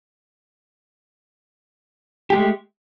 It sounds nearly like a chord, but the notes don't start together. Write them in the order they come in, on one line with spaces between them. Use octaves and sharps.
G4 G#3 A3